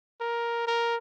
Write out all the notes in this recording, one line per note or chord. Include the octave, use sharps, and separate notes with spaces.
A#4
A#4